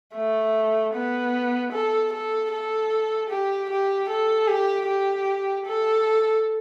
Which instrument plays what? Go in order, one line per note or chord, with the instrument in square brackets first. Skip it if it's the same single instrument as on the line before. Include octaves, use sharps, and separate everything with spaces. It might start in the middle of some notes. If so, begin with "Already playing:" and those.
[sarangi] A3
B3
A4
A4
A4
G4
G4
A4
G4
G4
A4